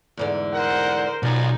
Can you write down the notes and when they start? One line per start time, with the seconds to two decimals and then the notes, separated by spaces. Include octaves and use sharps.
0.17 E2 G#2 D3
0.54 A#4 C5 F#5
1.23 B1 F3 D#4 D5 F#5 G#5